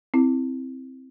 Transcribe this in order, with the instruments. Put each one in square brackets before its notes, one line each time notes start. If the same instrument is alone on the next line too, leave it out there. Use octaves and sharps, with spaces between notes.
[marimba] C4 E4